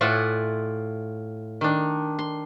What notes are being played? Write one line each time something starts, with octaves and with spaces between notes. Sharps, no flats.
A2 F4 D5 E5 F#5 G#5
D#3 D4
C6